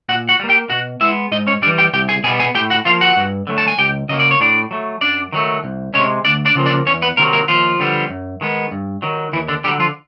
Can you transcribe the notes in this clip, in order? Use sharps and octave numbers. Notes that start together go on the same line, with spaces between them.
A#2 F#4 F#5
F#4 F#5
G3
A#3
G4 G5
B2 F#4 F#5
G#3 B3 E4 E5
G#2 D#4 D#5
C#4 C#5
E3 G3 D4 D5
G4 G5
C2 G4 G5
G#4 G#5
B2 G3 B3 G#4 G#5
G#4 G#5
A2 G4 G5
F#4 F#5
F3 A#3 F4 F5
F#4 F#5
G2
D3 F#3 A3
A5
G#5
C#2 G4 G5
C#3 F#3 A#3 D#5
D5
C#5
A2 D4 D5
F#3 A3
F#2 D4 D5
D#3 F#3 A3
C2
C3 E3 G#3 C#4 C#5
D2 D4 D5
D4 D5
C#3 F3 A#3
D4 D5
E2 C#4 C#5
B3 B4
C3 D#3 F#3 A#3 A#4
A#3 A#4
D#2 F3 F4
D3 G3 B3
F#2
D#3 G#3 B3
G2
D#3 F#3
D#2 E3 E4
D3 D4
D3 F#3 G3 G4
F3 F4